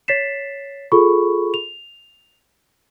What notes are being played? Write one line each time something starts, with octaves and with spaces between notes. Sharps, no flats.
C#5 A6 B6 C7 E7
F4 G#4 A4 B5 C#6
F7